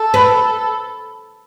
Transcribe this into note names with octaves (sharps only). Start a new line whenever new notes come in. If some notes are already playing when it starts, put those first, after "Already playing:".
Already playing: A4
B4